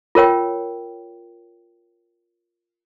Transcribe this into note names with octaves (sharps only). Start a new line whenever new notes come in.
F4 A#4 C#5 G5